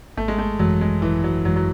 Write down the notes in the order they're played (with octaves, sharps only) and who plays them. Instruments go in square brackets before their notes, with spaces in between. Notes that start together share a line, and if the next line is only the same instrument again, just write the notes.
[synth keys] G#1 [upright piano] A3
[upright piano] G#3
A3
[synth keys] F#2 E3 G#3 [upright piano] F#3
[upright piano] G#3
[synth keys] G#1 [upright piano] E3
[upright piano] F#3
[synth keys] F#2 E3 G#3 [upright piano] F#3
[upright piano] F#3